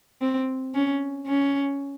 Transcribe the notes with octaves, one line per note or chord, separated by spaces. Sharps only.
C4
C#4
C#4